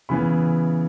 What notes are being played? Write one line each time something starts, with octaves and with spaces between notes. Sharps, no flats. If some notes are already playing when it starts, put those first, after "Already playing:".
C#3 E3 B3 B5